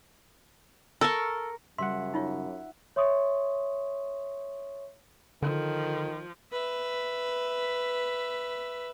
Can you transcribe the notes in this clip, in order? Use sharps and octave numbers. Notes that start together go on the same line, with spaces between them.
A4 A#4 C#6
F#2 C#3 G3 E5 F#5 C6
D#4 F4 C#5
C#5 E5 C6 C#6 D#6
D3 D#3 F3 A4
B4 E5